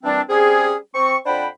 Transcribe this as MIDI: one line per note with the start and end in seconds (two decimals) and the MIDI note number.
0.04 0.21 46
0.04 0.21 52
0.04 0.21 55
0.04 0.21 60
0.04 0.21 62
0.29 0.76 55
0.29 0.76 60
0.29 0.76 61
0.29 0.76 68
0.95 1.17 60
0.95 1.17 85
1.26 1.47 41
1.26 1.47 62
1.26 1.47 72
1.26 1.47 78
1.26 1.47 79
1.26 1.47 83